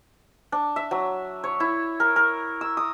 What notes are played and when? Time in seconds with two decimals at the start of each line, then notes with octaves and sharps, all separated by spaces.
0.52 D4
0.76 E5
0.91 F#3
1.44 C#5
1.60 E4
2.00 A#4
2.16 A#4
2.61 E6
2.77 D#6